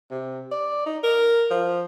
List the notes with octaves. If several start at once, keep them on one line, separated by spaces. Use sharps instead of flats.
C3
D5
D#4
A#4
F3